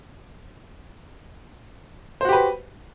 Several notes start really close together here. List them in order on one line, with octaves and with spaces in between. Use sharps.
C5 F#4 G4 B4